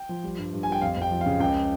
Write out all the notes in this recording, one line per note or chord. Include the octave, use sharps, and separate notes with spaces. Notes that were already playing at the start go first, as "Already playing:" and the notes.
Already playing: G5
F3
G3
G2
G2
G#5
G3 G5
F2 F5
F2
G5
F3
F5
C#3
C#2 G5